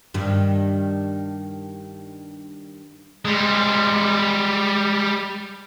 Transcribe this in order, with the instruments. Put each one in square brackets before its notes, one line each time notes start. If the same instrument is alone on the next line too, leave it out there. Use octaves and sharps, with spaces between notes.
[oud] G2 D#3
[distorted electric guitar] G3 G#3